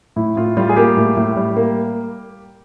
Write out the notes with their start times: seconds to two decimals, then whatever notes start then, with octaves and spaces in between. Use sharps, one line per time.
0.16 A2 E4
0.36 A2 F4
0.57 G3 F4
0.69 G#4
0.77 A#3 G4
0.97 A2
1.16 A2
1.36 G3
1.56 A#3